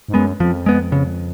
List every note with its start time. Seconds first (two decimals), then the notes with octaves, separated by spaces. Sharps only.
0.08 G#2
0.14 F#2 G#3 B3
0.40 F2 F3
0.66 G#3 B3
0.92 C#3